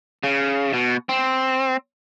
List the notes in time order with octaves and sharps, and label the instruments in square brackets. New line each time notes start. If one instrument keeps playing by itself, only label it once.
[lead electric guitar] C#3
B2
C4